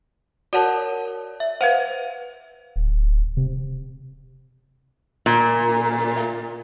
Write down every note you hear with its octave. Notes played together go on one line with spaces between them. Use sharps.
F#4 A#4 C#5 D5 F#5 A5
E5
B4 C5 F5 F#5
D1
C3
A#2